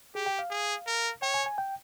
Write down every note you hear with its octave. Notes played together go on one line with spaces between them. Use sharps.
G4 G#4
G5
F5
G#4
A#4
C#5 G5
G#5
G#5
G5